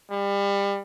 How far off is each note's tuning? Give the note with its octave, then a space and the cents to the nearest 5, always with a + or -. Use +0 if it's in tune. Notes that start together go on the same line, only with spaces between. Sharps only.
G3 +30